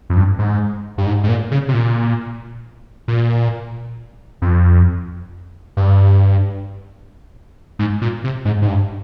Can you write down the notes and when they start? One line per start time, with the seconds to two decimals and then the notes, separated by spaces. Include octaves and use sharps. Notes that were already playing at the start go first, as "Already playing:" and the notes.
0.10 F2
0.17 G2
0.39 G#2
0.98 G2
1.06 G#2
1.24 G#2
1.29 A#2
1.51 C#3
1.68 C3
1.73 A#2
3.08 A#2
4.42 F2
5.77 G2
7.79 G#2
8.02 A#2
8.24 C3
8.45 G#2
8.62 G#2
8.68 G2